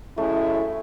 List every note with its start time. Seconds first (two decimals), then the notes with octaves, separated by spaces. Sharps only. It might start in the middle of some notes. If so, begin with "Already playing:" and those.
0.17 F#2 C#3 G#3 A3 C#4 E4